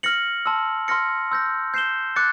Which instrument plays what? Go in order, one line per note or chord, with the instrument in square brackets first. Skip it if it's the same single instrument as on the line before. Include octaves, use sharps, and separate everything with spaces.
[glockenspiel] F6 A#6 C#7 F#7
A5 C6 E6
C6 F6 A#6 C#7
C6 E6 G6 A#6
G6 C7 E7 G7
D6 F#6 A6 C#7